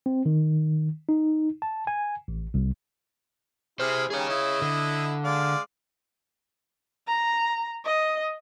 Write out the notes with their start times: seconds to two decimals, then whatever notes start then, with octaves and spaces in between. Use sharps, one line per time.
0.06 C4
0.26 D#3
1.09 D#4
1.62 A5
1.87 G#5
2.28 A1
2.54 C2
3.80 E4 G4 G#4 C5 F6
4.10 D#3 G3 C#4 G#4 C#5
4.29 E4 D#5
4.62 D3
5.24 G#3 D5 F5
7.07 A#5
7.85 D#5